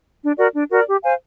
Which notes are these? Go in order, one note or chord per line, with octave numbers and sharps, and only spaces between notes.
D4
F#4 A#4 D5
D4
F#4 A#4 D5
G4
C5 F5 G#5